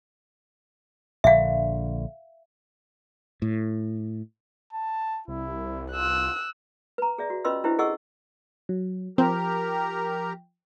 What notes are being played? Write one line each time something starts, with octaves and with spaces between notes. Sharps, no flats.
A#1 D3 E5 F5
A2
A5
C2 E4
F4 E6 F#6
B4 A#5
G#4 D5 E5
F#4
C#4 F4 B4 D#5 C6 E6
D4 E4 G4 B4 C5 E5
G#4 A4 D#5 F#5 C#6 E6
F#3
F3 C4 G4 A#4 G5 A#5